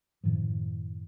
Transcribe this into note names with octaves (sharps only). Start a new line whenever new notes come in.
F#2 A2 D#3 F3